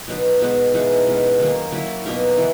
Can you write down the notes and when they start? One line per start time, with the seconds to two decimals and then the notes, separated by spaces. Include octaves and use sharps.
0.08 B2 F#3 B3 D#4
0.41 B2 G#3 B3 F#4
0.74 E3 G#3 D#4 F#4
1.07 B2 G#3 C#4
1.40 D#3 F#3 A#3
1.72 F#3 A#3 E4
2.06 B2 A#3 D#4 A#4
2.38 E3